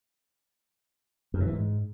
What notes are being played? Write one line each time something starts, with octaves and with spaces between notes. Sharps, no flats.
F#2
C3
E3
G#2